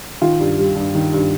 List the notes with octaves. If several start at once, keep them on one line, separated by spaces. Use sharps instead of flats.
D#3 F4
G2
G3
G2
D#3
G2